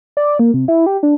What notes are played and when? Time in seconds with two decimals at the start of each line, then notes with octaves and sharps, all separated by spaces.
0.17 D5
0.39 A#3
0.54 C3
0.68 E4
0.86 G4
1.03 D4